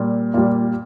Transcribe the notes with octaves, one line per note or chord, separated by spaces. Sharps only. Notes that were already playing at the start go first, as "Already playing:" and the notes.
Already playing: A#2 G3
A#2 G3 F4